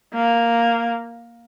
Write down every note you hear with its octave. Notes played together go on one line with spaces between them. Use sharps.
A#3